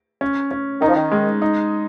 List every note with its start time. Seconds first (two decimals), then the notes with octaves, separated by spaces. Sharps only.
0.21 C#4
0.51 C#4
0.81 D#3 D#4
0.88 F3
0.95 D#3
1.12 G#3
1.42 D#4